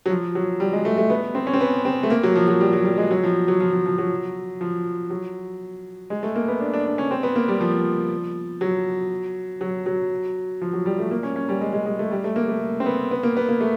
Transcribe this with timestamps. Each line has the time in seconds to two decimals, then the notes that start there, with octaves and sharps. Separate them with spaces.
0.06 F#3
0.10 F3
0.35 F#3
0.60 G3
0.73 G#3
0.85 A3
0.98 A3
1.10 B3
1.35 C4
1.47 C#4
1.53 C4
1.61 B3
1.85 C4
2.03 A3
2.10 A#3
2.23 F#3
2.36 F3
2.48 F#3
2.61 G3
2.73 F#3
2.85 G3
2.98 G#3
3.11 F#3
3.23 F3
3.48 F#3
3.60 F3
3.73 F3
3.86 F3
3.98 F#3
4.61 F3
5.10 F#3
6.10 G#3
6.23 A3
6.36 A#3
6.48 B3
6.60 D4
6.74 D4
6.86 D4
6.98 C#4
7.11 C4
7.23 B3
7.36 A#3
7.48 G3
7.61 F3
8.61 F#3
9.61 F#3
9.86 F#3
10.61 F3
10.73 F#3
10.86 G3
10.99 A3
11.11 A#3
11.23 C#4
11.36 C#4
11.49 G3
11.61 G#3
11.73 G#3
11.86 G#3
11.99 A3
12.11 G3
12.24 A3
12.36 A#3
12.49 A3
12.80 C4
12.86 B3
13.11 B3
13.23 A#3
13.37 B3
13.49 A#3
13.61 A3